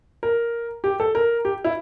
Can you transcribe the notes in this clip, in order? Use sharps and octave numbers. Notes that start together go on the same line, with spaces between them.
A#4
G4
A4
A#4
G4
E4